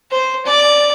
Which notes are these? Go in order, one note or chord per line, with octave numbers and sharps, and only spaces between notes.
C5
D5